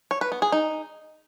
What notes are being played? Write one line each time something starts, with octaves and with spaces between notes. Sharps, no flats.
C#5
B4
B3
G#4
D#4